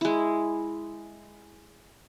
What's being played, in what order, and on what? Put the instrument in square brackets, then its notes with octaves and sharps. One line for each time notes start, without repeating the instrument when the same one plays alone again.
[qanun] G#3 E4